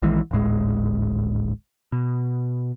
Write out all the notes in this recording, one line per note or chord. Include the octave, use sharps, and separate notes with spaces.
A#1 D#3 E3 G#3
D1 G#1 A2 G#3
B2